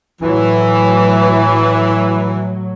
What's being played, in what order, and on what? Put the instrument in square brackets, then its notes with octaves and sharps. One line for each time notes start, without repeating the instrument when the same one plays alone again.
[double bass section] A2 F#3 [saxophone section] E3